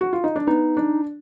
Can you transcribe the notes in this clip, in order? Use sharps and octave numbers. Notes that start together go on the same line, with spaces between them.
F#4
F4
D#4
D4
B3 D#4
D4